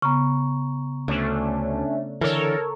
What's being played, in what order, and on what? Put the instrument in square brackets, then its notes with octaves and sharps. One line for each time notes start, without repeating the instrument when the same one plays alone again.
[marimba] C#3 B3 [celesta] A#5 C#6
[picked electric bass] D2 [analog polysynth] A3 C#4 D4
[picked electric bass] D3 E3 [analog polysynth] A4 A#4 C#5